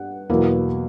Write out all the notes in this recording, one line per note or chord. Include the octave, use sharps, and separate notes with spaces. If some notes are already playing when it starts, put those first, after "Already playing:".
Already playing: G2 F#5
E2 B2 F#3 A#3 E4